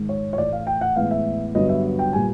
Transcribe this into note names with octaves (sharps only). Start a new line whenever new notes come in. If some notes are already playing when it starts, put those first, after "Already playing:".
Already playing: G#2 D#3 G#3
C#5
C#5
A2 E3 A3 D5
F5
G5
F#5
A2 E3 G#3 B3 F5
E5
G2 D3 F#3 B3 D#5
E5
G5
A#2 G3 B3 G#5